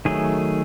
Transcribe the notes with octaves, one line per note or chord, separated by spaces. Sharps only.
D#3 F#3 A3 G#4